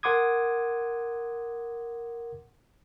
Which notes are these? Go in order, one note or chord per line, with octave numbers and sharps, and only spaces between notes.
A#4 F#5 C6 D6 D#6 G#6